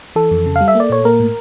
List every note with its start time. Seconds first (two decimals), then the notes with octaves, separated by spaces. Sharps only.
0.16 E3 A4
0.31 F2
0.46 C#3
0.56 F5
0.61 G3
0.68 E5
0.75 A#3
0.80 D5
0.90 A#2 C#5
1.05 A#3 A#4
1.20 A2